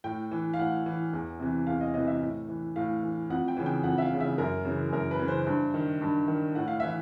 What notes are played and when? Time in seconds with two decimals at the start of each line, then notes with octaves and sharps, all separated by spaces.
0.04 A2 G5
0.31 E3
0.54 F5
0.58 A2 F#5
0.86 E3
1.13 E2
1.39 C3 E3
1.67 E2 F5
1.81 D#5
1.94 C3 E3 D#5
2.07 E5
2.21 A2
2.49 E3
2.76 A2 F5
3.02 E3
3.30 F2 F#5
3.48 G5
3.57 C#3 E3
3.66 G5
3.84 F2 F#5
3.98 E5
4.02 F5
4.11 C#3 E3
4.20 E5
4.38 F#2 A#4
4.65 C#3 E3
4.92 F#2 A#4
5.11 B4
5.19 C#3 E3
5.28 C5
5.47 G2
5.74 D#3
6.02 G2
6.28 D#3
6.55 A2 F#5
6.68 F5
6.80 E3 E5